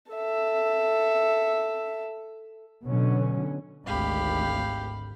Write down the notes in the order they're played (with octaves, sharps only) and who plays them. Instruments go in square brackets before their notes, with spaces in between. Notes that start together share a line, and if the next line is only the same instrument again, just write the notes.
[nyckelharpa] A4 E5
[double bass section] B2 D3 F#3 C#4
[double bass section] G#1 D2 [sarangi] G4 [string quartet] F5 B5